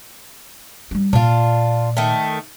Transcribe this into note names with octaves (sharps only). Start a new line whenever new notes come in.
G3 D4
A#2 D4 F4
D#3 A3